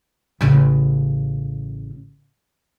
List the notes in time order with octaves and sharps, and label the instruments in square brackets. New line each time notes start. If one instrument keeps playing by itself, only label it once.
[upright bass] A1 C#3